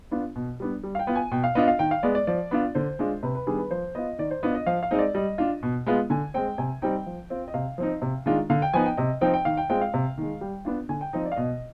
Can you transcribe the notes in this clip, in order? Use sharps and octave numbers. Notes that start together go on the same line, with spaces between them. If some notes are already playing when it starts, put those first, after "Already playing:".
B3 D4 F4
B2
G3 B3 D4
G3
F5
G5
B3 F4
G#5
B2 G5
F5
B3 D4 F4 D#5
F5
D#3 G5
F5
G#3 B3 D5
D5
F3 D5
B3 D4 F4
D3 C5
G#3 D4 F4
C3 B4
B4
D#3 G3 B3 D4 G#4
B4
F3 C5
B3 F4 D#5
D#3 D5
C5
B3 D4 F4 D#5
D#5
F3 F5
F5
G#3 C4 D#4 D#5
D5
G3 D#5
D4 F4
B2
G#3 B3 F4
D3 G#5
G#3 C4 G5
C3 G#5
G3 C4 D#4 G5
F3
C4 F4
D#5
C3 F5
F3 C4 D#4
C3
D#3 G#3 D4 F4
D3 F5
G5
F3 B3 D#4 G#5
G5
C3 D#5
F3 C4 D#4 G5
G5
D#3 F5
G5
G#3 C4 F4 G5
F5
C3
D#3 G#3
G3 G5
B3 D4 F4
D3 G#5
G5
F3 C4 D#4 D#5
D5
F5
B2 D#5